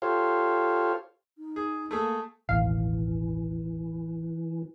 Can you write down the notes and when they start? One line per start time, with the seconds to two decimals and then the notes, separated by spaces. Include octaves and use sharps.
0.02 F4 G4 A4 C5 C#5 F5
1.38 D#4
1.56 G#4
1.91 A3 A#3 G#4 A4
2.49 E1 A1 D#2 E3 F5